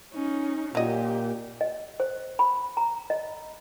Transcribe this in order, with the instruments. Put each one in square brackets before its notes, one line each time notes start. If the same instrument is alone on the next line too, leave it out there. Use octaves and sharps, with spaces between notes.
[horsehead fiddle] C#4 D#4
[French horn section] A#2 [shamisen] F#3 D#5 [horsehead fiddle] G4
[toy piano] D#5
C5
B5
A#5
D#5